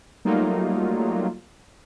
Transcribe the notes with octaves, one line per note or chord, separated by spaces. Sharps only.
F#3 G3 A3 A#3 D#4 F4